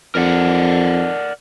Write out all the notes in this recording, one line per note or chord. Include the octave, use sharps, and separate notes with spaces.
F2 A#4 D5 F#5